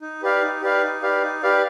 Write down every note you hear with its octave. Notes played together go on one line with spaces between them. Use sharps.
D#4
G4 B4 D5 F5
D#4
G4 B4 D5 F5
D#4
G4 B4 D5 F5
D#4
G4 B4 D5 F5